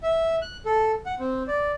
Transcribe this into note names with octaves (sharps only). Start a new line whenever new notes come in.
E5
F#6
A4
F#5
C4
D5